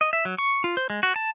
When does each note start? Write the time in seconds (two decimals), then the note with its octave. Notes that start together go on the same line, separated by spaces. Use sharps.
0.01 D#5
0.13 E5
0.25 F#3
0.38 C#6
0.64 F4
0.77 C5
0.90 G#3
1.03 F#4
1.16 A5